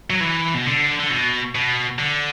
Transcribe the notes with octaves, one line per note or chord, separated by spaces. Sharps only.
F#3
E3
B2
D3
D3
B2
B2
D3